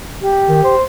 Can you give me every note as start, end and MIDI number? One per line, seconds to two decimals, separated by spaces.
0.21 0.74 67
0.48 0.61 51
0.64 0.83 72